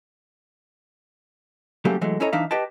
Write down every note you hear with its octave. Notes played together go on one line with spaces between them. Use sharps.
C#3 F#3 G3 A3 A#3 G4
E3 F#3 G#3 A3
C#4 E4 A4 C#5 D#5 A#5
E3 D4 D#4 E5 F5
G4 B4 D#5 G5 A5